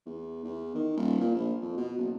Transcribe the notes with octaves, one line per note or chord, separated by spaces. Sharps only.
E2
E2
D#3
D#1
A#2
A#1
F2
B2
F#1